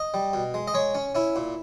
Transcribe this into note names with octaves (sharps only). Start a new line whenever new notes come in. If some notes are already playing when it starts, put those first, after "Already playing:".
Already playing: D#5
G3
B2
G#3
D#5
G#3 C#5
C#4
C#4 E4
A#2